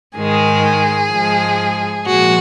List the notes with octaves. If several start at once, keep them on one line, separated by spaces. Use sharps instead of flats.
G#2 D#3 G#3 G#4
G#2 F3 G#3
A#2 F3 G#3 F#4